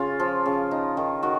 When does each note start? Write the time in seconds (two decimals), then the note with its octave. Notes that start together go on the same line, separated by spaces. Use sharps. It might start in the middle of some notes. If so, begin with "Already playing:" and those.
Already playing: C#3 F4
0.20 F3
0.46 C#3
0.71 D#4
0.97 D#3
1.23 D#3 F#4